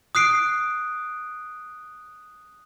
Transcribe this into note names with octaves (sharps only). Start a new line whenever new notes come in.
D#6 F#6 C7 D7